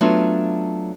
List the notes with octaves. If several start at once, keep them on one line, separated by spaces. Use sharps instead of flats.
F#3 A3 B3 C#4 D4 F4